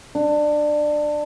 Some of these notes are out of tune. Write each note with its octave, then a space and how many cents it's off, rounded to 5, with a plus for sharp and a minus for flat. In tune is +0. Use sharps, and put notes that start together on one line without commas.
D4 +20